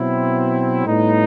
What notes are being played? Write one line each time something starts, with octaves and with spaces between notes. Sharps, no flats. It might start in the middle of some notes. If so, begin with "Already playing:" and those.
Already playing: B2 F#3 C4 E4
A2 G3 B3 D#4